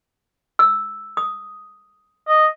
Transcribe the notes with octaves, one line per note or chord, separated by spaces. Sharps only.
E6
D#6
D#5